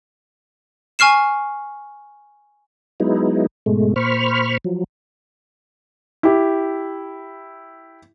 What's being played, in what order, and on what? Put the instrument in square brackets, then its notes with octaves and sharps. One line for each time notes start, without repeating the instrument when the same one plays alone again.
[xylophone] G#5 C#6 F6 C7 E7
[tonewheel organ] F#3 G#3 B3 D#4 E4
G#2 B2 G#3 A3
A#2 C5 B5 C#6 F6
F3 F#3
[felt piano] E4 G4